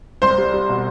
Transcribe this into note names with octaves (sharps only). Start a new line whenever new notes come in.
C2 C5 C6
G3
G3
B2